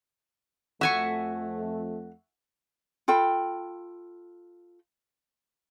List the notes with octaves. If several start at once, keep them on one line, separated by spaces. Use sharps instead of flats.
F2 A3 F#4 E5 G#5 C#6
F4 A4 G5 B5